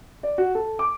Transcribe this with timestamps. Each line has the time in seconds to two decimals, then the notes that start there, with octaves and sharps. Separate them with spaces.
0.23 D5
0.38 F#4
0.55 A4
0.79 D6